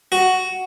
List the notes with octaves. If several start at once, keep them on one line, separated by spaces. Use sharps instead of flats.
F#4